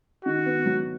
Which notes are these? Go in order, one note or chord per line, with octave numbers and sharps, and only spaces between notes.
D#3 F#4
B3
F#3